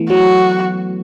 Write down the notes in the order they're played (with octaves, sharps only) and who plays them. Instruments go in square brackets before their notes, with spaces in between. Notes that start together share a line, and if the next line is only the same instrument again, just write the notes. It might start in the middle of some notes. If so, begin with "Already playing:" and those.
Already playing: [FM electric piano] E3 A3 B3
[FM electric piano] F#3 [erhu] F#4